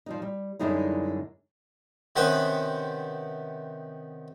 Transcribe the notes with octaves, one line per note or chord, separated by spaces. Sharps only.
F3 G3 D#4
G3
F#2 D3 G3 G#3 D#4 E4
C3 D#3 B3 C#4 B4 C5